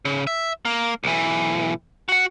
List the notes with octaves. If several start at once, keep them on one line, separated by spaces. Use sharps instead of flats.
C#3
E5
A#3
B1 E3
F#4 F#5